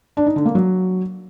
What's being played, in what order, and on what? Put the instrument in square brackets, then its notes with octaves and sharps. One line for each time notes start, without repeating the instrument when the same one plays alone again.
[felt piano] D4
D#4
D3
A#3
F#3